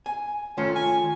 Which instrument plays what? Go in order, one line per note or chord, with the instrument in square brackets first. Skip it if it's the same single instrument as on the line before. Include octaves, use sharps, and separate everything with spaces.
[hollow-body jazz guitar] G#5
[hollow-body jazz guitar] D#3 A3 F4 [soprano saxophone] C#4
[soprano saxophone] G#5